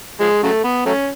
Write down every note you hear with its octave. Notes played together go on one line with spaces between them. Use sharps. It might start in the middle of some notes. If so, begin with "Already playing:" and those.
F3 G#3
C#3 F#3 A3
B3
F#3 A3 C#4